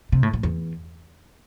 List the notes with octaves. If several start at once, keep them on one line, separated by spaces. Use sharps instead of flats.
C3
A2
A2
E2